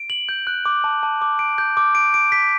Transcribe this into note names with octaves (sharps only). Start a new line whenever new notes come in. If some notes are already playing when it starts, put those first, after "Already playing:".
Already playing: D7
F#7
G6
F#6
D6
A5
A5
D6
D7
G6
D6
D7
D7
B6